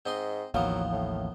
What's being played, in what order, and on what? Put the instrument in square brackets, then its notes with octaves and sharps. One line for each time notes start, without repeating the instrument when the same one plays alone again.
[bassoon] G#2 [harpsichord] C4 D#5 C6
[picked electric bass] A1 D#2 [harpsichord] D#3 F3 B3 [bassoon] F#3 [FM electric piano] F5
[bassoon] A2